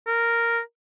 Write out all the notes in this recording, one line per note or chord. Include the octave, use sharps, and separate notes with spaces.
A#4